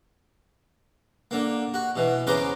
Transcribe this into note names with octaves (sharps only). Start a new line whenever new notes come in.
D3 A#3
F#4
B2 E3
E2 C#3 B4 C5 A#5 D6